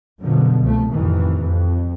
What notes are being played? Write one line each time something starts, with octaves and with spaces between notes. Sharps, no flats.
F#2 B2 D3 F3
C2 F3 A3
A1 F2 D#3 E3
F2